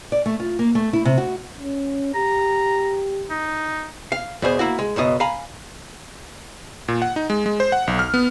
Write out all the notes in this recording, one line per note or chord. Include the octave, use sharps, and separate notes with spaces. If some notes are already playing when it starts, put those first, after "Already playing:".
D5
A3
F4
A#3
A3
E4
C3
F#4
C#4
G4 A#5
D#4
F5
E2 B2 G#4 C5
A#3 E4 F#4
G#3
C#2 F#2 B2 D#5
F5 G#5 A#5 B5
A#2
F#5
D#4
G#3
G#3
C5
F#5
B1
F6
B3